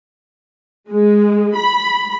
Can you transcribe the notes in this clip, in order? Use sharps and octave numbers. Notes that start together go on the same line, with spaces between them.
G#3
B5